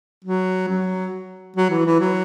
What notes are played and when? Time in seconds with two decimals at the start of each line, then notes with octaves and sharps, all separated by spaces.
0.25 F#3
0.68 F#3
1.56 F#3
1.70 E3
1.86 E3
2.00 F#3